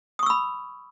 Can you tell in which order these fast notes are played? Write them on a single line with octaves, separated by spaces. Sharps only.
D#6 C#6 E6 B5